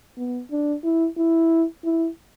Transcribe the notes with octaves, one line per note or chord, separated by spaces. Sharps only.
B3
D4
E4
E4
E4